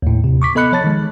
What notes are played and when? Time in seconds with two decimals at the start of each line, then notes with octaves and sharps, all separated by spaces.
0.02 D#2 A2
0.24 C3
0.42 C#6 D6 B6
0.55 B3 A4 D#5 B5 F#6 C#7
0.72 F3 C#5 A5 A6
0.84 D#3 G#3